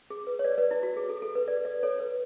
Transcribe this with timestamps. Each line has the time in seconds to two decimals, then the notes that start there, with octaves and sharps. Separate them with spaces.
0.10 G#4
0.27 B4
0.39 C#5
0.44 B4 D5
0.58 B4 D5
0.71 E4
0.83 F#4
0.97 G#4
1.09 A4
1.22 A4
1.35 B4
1.48 B4 D5
1.65 B4 D5
1.83 A4 C#5
2.00 B4